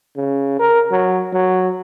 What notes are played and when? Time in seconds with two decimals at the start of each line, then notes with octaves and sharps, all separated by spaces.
0.16 C#3
0.59 A#4
0.91 F#3
1.33 F#3